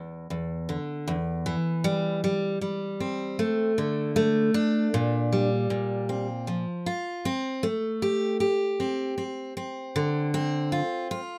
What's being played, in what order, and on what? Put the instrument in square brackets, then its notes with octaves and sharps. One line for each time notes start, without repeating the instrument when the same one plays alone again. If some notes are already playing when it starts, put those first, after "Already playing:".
Already playing: [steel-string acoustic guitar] E2
E2
D3
E2
E3
G3
G3
G3
C4
A3
D3
A3
D4
A#2
G3
A#2
C4
F3
F4
C4
A3
G4
G4
C4
C4
C4
D3
C4
F4
F4